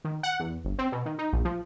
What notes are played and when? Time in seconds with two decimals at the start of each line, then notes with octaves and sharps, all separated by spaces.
0.04 D#3
0.23 F#5
0.40 E2
0.64 G1
0.78 C4
0.92 B2
1.06 D#3
1.18 D#4
1.33 A#1
1.45 F3